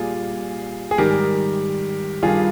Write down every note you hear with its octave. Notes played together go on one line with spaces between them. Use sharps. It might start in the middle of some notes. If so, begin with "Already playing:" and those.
Already playing: A#2 G3 F4 G#4
G#4
G#2 D#3 G3 G4 A#4
G2 D#3 G3 F4 G#4